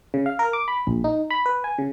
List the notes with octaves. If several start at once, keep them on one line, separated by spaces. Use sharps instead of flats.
C#3
F5
A#4
D6
B5
A#1
D#4
B5
B4
G#5
C#3